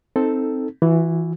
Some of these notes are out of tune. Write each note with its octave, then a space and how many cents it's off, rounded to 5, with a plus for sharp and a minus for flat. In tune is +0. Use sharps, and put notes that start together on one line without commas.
C4 +0 D#4 +0 A4 +0
E3 +0 F#4 -40